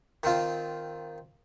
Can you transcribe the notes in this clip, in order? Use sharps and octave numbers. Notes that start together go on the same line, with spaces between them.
D#3 C4 F4